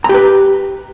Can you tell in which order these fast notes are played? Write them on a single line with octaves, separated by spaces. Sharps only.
A#5 G4 B4